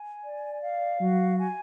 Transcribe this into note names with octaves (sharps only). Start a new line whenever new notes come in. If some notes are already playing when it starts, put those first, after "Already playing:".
Already playing: G#5
D5
F5
F#3 F#4
G#5